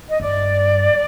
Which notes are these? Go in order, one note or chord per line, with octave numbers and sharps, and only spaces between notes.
D#5
G2 D5